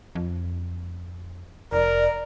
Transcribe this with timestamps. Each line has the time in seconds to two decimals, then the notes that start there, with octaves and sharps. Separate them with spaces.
0.15 F2
1.72 F1 A#4 D5